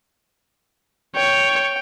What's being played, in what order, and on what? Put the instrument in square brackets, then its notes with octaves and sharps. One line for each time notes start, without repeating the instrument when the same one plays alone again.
[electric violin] C#5 [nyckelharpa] G5